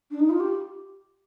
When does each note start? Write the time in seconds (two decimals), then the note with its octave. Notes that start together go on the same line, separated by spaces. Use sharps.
0.11 D4
0.20 D#4
0.30 F4
0.40 G4